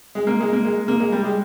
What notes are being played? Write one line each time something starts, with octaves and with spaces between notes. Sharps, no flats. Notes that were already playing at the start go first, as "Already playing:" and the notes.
G#3
A#3
G#3
A#3
G#3
A#3
G#3
G3
G#3